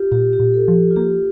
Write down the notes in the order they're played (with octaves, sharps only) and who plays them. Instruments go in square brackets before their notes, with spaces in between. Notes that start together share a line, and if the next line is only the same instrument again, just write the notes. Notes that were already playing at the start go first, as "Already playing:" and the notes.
Already playing: [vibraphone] F4 G4
[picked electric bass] A#2 [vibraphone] G4
[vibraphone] G4
[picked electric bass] A#2
[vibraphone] A4
[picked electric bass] F3
[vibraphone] F4
[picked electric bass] A#3 [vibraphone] G4